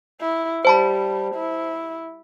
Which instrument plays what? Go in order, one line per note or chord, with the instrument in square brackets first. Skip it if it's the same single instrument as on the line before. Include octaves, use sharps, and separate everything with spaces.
[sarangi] E4
[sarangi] G3 [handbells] C5 A5 B5
[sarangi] E4